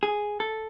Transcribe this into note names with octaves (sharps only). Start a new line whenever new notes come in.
G#4
A4